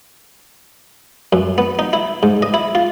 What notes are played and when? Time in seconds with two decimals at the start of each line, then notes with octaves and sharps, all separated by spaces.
1.33 F#2
1.58 B3
1.79 D#4
1.93 E4
2.23 G#2
2.42 D#5
2.54 E4
2.75 F4